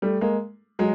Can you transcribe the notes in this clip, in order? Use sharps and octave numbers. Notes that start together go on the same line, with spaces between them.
G3 A3
G#3 A#3
F#3 G#3